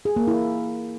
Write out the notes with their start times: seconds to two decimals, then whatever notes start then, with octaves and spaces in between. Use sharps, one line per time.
0.05 G#4
0.16 A#3
0.27 E4